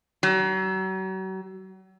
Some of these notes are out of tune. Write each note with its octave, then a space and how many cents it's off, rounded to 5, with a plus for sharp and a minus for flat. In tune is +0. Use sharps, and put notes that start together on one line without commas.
F#3 +40